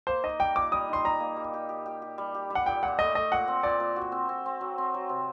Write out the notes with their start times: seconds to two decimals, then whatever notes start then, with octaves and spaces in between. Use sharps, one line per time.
0.07 A#3 C5
0.23 D#4 D#5
0.39 G3 G5
0.56 A#2 D6
0.72 G3 D#6
0.89 D#4 C6
1.05 G3 A#5
1.20 A#3
1.37 G3
1.54 G4
1.69 G4
1.86 G4
2.02 G4
2.18 G3
2.35 G4
2.50 G3
2.55 F#5
2.66 A#2 G5
2.82 A#2 F#5
2.99 A3 D#5
3.15 A3 D#5
3.32 A#2 F#5
3.48 C4
3.63 A#2 D5
3.80 A#2
3.96 F#4
4.12 C4
4.29 C4
4.46 C4
4.61 F#3
4.78 C4
4.94 F#3
5.09 C3